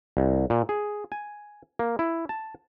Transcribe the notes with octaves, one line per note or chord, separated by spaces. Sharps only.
C2
A#2
G#4
G#5
A#3
E4
A5